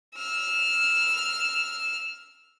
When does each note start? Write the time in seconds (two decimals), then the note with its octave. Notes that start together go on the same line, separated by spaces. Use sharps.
0.17 E6 F6